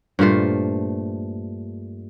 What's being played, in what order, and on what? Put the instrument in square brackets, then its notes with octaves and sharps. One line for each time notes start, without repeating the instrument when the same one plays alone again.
[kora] G2 A#2 A3 C5